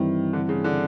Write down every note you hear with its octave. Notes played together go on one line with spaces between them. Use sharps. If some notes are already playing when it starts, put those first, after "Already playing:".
Already playing: G2 D#3 E3 G3 C4 E4
D3
C#3
D3